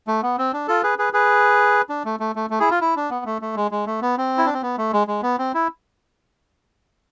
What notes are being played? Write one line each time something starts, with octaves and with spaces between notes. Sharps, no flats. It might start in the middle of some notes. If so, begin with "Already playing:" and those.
A3
B3
C4
D4
F4 A4
G#4 B4
G#4 B4
G#4 B4
D4
A3
A3
A3
A3
E4 G#4
F4
E4
D4
B3
A3
A3
G#3
G#3
A3
B3
C4
E4
D4
C4
B3
A3
G#3
G#3
B3
C4
E4